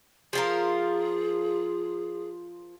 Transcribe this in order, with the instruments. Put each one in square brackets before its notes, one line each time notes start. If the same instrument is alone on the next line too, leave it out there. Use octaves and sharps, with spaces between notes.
[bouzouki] F3 F4 A#4 [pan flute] G#4